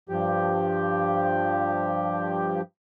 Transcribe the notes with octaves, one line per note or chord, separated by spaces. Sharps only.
G2 F3 G4